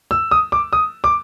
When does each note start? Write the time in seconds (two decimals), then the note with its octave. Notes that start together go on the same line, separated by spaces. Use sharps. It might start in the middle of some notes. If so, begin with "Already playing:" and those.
0.11 E6
0.31 D#6
0.52 D6
0.73 D#6
1.04 D6